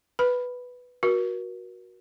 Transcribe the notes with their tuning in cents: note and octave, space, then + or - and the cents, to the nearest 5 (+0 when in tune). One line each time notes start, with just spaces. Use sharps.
B4 +0 B5 +0
F#4 +0 A#4 +40